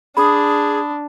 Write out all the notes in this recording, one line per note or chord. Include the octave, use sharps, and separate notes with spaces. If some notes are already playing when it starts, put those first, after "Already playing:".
D4 G#4 B5 D#6